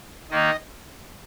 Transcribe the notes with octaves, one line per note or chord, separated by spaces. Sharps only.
D#3 A#3 D#4 D#5